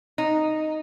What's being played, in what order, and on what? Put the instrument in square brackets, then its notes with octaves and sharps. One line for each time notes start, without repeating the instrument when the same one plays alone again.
[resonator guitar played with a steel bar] D#4